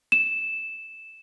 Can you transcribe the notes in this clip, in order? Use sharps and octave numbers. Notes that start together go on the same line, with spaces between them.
E7